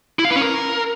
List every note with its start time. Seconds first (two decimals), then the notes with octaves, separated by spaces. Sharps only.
0.19 E4
0.25 F5
0.30 B4
0.36 C#4
0.41 A#4